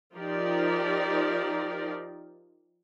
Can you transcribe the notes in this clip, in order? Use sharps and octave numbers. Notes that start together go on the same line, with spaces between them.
F3 D#4 F4 G4 A#4 D5